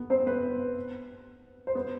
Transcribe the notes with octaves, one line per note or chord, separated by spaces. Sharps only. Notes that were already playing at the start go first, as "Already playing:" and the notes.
Already playing: B3 B4
C4 C5
B3 B4
C5
B3 B4